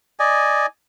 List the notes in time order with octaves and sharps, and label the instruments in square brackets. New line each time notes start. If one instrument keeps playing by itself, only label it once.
[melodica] D5 D#5 G#5